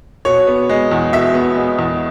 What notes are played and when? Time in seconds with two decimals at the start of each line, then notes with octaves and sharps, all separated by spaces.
0.25 B2 C#5
0.47 B3
0.69 G#3
0.91 E2
1.13 B2 E5
1.34 B3
1.56 G#3
1.79 E2